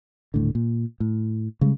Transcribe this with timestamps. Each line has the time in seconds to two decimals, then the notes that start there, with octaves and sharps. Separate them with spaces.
0.34 D#1 A2 D3
0.55 A#2
1.00 A2
1.61 C#3 G3 G#3